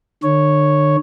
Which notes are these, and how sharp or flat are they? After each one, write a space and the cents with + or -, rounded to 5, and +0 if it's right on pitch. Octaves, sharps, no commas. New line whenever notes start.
D3 +40 C#5 +0